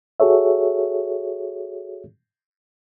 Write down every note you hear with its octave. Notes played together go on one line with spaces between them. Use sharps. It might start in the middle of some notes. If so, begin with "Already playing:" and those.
F#4 G#4 A4 C#5 E5